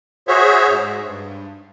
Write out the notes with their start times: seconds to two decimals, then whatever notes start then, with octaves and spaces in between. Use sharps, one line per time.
0.28 F#4 G#4 C5 C#5 E5
0.70 G#2
1.05 G2